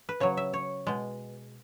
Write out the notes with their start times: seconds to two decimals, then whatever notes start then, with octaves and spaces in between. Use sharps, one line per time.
0.09 B4
0.20 C#3 F#3 C#5
0.37 E5
0.53 C#5
0.87 B2 G#3